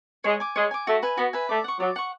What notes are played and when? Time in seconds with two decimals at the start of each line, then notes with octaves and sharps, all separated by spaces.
0.24 G#3 C#5
0.40 G#5 D6
0.56 G#3 C#5
0.71 G#5 D6
0.87 A3 F#4
1.03 B4 E5 G#5
1.17 B3 F#4
1.33 B4 E5 G#5
1.49 A3 D5
1.64 F#5 C#6
1.79 F#3 D5
1.96 F#5 C#6